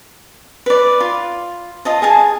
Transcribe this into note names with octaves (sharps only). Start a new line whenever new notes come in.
B4 D5
F4
F4 D#5 A5
G#4 G#5 A5